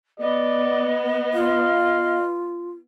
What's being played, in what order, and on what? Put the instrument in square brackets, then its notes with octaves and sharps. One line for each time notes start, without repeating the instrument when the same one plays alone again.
[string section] B3 [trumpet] D5 [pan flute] D#5
[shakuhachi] F4 [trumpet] F5